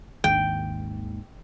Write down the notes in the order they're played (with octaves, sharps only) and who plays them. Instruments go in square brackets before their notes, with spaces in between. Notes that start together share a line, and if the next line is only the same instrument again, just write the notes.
[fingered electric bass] G#1 D#2 G#2 [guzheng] G5